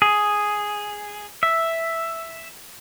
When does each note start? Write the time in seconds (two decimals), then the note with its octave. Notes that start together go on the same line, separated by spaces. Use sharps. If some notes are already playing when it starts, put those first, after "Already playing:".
0.02 G#4
1.43 E5